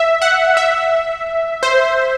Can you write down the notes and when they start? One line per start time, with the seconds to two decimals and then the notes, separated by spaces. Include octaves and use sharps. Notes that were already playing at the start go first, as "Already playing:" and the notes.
Already playing: E5
0.22 F#5
0.57 E5
1.63 C5